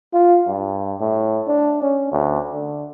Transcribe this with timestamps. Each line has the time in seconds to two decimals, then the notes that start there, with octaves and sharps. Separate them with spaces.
0.13 F4
0.47 G2
1.00 A2
1.47 D4
1.82 C#4
2.12 D2
2.53 D3